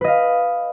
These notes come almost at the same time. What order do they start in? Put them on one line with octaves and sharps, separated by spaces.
B4 D#5 F5